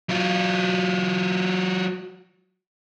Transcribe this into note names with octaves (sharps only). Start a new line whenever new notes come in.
F#3 F4